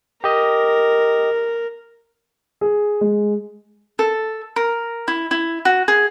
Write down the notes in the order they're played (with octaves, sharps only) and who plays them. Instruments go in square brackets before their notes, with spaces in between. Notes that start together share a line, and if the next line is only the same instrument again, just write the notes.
[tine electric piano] G4 D#5 [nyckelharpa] A#4
[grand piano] G#4
G#3
[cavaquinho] A4
A#4
E4
E4
F#4
G#4